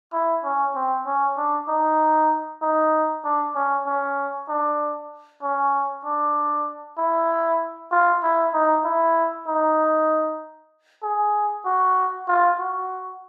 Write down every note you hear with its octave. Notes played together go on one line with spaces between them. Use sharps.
E4
C#4
C4
C#4
D4
D#4
D#4
D4
C#4
C#4
D4
C#4
D4
E4
F4
E4
D#4
E4
D#4
G#4
F#4
F4
F#4